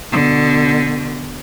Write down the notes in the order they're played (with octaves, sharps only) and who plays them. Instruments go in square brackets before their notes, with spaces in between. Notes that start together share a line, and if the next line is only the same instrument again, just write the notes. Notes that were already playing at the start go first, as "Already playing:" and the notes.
[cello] B2 D3